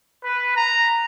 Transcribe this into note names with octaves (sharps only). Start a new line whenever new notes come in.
B4
A#5